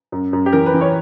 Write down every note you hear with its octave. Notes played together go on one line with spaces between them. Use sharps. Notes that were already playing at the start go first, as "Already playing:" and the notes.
F#2
F#2
G4
E3 A#4
B4
E3
C#5